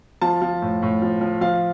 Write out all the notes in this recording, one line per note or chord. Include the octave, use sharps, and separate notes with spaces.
F3 A5
F3
A2
A2
F3
F3
F3 F5